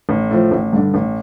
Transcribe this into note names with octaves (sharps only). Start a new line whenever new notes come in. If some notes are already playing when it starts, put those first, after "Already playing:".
A1
A2 F3
A1
G2 D3
A1